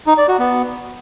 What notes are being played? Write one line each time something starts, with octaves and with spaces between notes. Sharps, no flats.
D#4
D5
F#4
B3